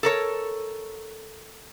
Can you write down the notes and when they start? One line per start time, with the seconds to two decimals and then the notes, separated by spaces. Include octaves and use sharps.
0.03 A4 A#4 C#5